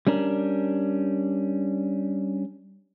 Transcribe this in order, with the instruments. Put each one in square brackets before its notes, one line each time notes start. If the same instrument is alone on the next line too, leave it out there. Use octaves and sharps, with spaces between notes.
[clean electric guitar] G3 C#4 D4 A#4